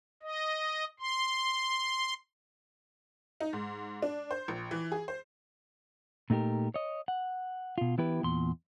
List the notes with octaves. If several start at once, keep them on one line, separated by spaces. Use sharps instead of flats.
D#5
C6
D#4
G#2
D4
C5
A#1
E3
G#4
C5
A#2 A3 D#4 F#4 G4 A#4
C#5 D#5
F#5
B2 F4
E3 B3 E4 G4 B4
E2 A#2 C6